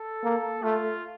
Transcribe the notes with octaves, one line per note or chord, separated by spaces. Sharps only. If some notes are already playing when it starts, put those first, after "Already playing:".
Already playing: A4
A#3
A3 F4